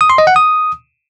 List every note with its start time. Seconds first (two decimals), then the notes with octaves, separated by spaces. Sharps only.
0.01 D#6
0.10 C6
0.18 D#5
0.27 F#5
0.36 D#6